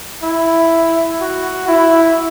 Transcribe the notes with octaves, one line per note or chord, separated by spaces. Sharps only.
E4
F#4
E4